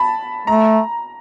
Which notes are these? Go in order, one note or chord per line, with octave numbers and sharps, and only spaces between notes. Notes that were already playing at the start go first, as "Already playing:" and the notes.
Already playing: A5 B5
A3 A#5